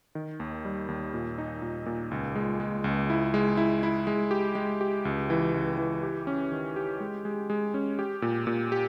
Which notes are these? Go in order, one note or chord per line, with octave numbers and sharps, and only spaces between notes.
D#3
D#2
G3
D#2
A#2
D#4
A#2
A#2
C#2
G#3
G#3
C#2
E4
G#3
E4
E4
G#3
G4
G#3
G4
C#2
E3
C#2
E3
G4
C#4
D#3
G4
G#3
G#3
G#3
C#4
G4
A#2
A#2
G4